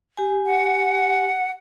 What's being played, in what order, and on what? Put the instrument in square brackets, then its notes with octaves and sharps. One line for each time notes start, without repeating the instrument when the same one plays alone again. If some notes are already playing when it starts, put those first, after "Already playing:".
[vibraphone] G4 G#5
[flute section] F#5